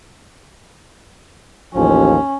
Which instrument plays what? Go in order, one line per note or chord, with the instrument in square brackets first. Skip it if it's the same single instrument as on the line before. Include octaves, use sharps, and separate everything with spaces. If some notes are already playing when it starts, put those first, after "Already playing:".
[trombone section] A1 D#2 F3 [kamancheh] C#4